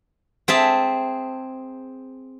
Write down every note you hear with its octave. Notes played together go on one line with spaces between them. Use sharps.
C4 G#4 E5 A5